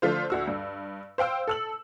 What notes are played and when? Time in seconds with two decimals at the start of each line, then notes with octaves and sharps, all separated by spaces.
0.02 D3 F3 A3 F4 C5
0.30 D2 F#4 E6
0.47 G2
1.18 C5 F5 G5 E6
1.48 A4 E6 F#7